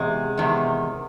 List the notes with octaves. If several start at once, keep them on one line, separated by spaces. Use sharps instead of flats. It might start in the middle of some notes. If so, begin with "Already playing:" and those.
Already playing: E2 C3 G#3
E2 C3 D#3